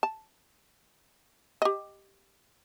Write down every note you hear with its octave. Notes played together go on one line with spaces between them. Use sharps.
A5
G4 D#5